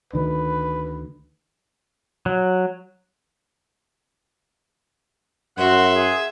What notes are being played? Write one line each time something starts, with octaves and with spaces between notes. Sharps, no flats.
D2 D#3 D4 B4
F#3
F#2 F#4 E5 F#5 C6
G#4